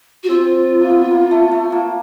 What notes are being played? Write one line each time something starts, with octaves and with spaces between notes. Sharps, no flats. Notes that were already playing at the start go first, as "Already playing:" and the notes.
F#4
C4 F4
A#3
B3
A#3
A3
A3
A#3